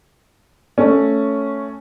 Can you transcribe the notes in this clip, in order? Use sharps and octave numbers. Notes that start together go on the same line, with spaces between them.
A3 C#4